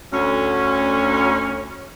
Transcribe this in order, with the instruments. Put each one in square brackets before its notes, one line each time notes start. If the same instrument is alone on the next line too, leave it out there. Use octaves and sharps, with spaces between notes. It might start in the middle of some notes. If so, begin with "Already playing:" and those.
[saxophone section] D2 C#4